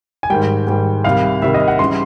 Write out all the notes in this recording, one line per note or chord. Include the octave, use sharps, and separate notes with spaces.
G#5
G#2 D#3 G3 G5
G#2 D#3 G3
C2 C3 D#3 G3 F5
C2 C3 D#3 G3 E5
D#5
F#5
C#3 E3 G3 C6